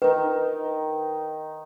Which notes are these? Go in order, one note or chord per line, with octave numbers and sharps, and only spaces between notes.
D#3 D#4 B4